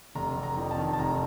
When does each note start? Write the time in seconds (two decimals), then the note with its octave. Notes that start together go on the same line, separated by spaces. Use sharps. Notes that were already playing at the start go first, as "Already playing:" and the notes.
0.15 F1 A#5
0.36 F1
0.43 A#5
0.57 F2
0.71 A5
0.78 D#3
0.93 A5
0.99 F1 A#5